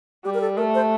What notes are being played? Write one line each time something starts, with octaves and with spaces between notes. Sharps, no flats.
G3 G4
A#4
A4
A3 A#4
C5